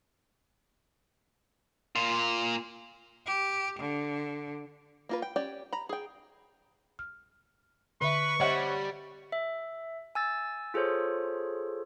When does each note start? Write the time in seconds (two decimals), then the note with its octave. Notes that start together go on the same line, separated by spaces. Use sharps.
1.96 A#2 F4
3.26 G4
3.80 D3
5.09 A#3 F4 B4
5.22 G5
5.36 C#4 G4 D5 G5
5.73 A#5 B5
5.89 G#4 G5
6.99 F6
8.01 D3 B4 E5 C#6
8.40 G3 C4 C#5 D#5 E5 F#5
9.32 E5
10.15 G#5 E6 A6
10.74 F4 G#4 A4 C5 C#5